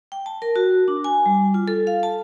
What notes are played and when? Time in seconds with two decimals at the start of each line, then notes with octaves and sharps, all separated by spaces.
0.12 G5
0.26 A5
0.42 A#4
0.56 F#4
0.88 D4
1.04 G#5
1.26 G3
1.54 F4
1.68 A4
1.87 F5
2.03 A5